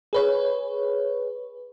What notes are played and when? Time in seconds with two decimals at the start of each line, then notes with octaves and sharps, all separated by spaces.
0.13 G#4 B4 C#5